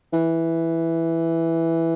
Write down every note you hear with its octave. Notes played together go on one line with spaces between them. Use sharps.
E3